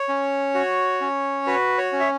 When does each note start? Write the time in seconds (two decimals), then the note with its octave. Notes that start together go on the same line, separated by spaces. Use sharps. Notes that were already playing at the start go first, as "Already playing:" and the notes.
Already playing: C#5
0.09 C#4
0.55 F#4
1.01 C#4
1.47 F#4 B4
1.78 C#5
1.93 C#4
2.00 E5